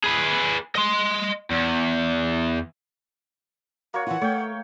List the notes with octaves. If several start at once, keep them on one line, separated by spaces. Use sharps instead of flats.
G#4 B4
D#5 C6
E2
A#3 F#4 C#5
E3 F4 F#5
A3 C#5 G5